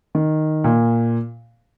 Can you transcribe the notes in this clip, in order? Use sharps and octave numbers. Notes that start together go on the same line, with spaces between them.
D#3
A#2